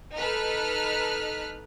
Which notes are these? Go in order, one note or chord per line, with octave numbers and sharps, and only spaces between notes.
D#4 A4 B4 F6 F#6 B6